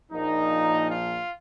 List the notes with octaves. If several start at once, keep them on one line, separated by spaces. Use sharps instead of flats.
A#1 A#2 F3 A#3 D#4
F4